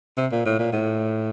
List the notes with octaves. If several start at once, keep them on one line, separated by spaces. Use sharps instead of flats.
C3
A#2
A2
A#2
A2